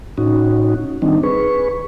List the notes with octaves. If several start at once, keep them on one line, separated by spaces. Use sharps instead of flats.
A2 C#4 D#4 F#4
D#3 G3 C4 D4 D#4
G#4 B4 C#6